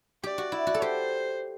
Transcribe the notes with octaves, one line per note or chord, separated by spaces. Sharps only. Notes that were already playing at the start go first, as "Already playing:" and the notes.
G4 D5
F#4
E4
F#4
A4
G4 C5